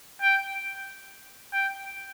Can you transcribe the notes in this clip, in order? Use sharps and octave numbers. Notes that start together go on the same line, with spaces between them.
G5
G5